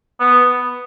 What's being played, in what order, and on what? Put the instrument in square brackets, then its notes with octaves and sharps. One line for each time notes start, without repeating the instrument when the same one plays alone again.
[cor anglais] B3